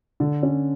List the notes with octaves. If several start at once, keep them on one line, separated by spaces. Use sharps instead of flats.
D3
C#4